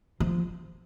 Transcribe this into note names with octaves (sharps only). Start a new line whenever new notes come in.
F3